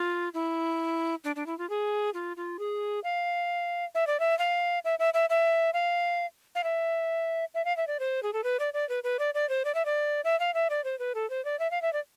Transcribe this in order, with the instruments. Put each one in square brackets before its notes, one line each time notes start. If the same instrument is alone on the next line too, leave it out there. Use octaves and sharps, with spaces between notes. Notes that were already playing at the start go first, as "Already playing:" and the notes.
Already playing: [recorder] F4
E4
D4
D4
E4
F4
G#4
F4
F4
G#4
F5
E5
D5
E5
F5
E5
E5
E5
E5
F5
F5
E5
E5
F5
E5
D5
C5
G#4
A4
B4
D5
D5
B4
B4
D5
D5
C5
D5
E5
D5
E5
F5
E5
D5
C5
B4
A4
C5
D5
E5
F5
E5
D5